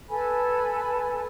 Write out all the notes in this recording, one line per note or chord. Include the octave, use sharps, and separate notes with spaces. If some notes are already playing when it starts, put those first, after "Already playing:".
A4 B4 G#5 B5